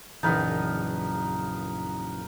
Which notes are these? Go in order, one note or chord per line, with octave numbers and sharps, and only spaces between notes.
A#1 F#2 C#3 E3 D#4 A#4 B4 A5